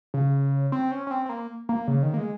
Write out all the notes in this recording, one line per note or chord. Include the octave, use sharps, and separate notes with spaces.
C#3
C4
C#4
C#4
C4
C4
A#3
A#3
C#3
D#3
A#3
G#3